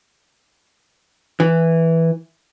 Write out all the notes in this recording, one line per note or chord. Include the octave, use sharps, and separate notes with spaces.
E3